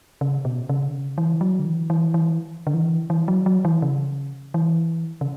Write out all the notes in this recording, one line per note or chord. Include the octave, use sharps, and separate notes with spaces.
C#3
B2
C#3
D3
C#3
E3
F#3
D3
E3
E3
E3
D3
E3
E3
F#3
F#3
E3
C#3
E3
C#3